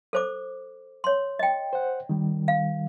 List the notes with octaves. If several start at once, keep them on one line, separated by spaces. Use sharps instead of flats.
A4 C5 D6
C#5 C6
D#5 G5
C5 F#5
D#3 G3
F5